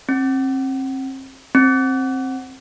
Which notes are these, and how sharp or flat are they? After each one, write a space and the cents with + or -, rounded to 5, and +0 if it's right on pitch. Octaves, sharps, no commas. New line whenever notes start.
C4 +35
C4 +15